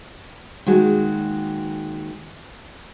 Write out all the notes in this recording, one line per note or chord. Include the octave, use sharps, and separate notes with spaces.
D#3 G#3 A#3 F#4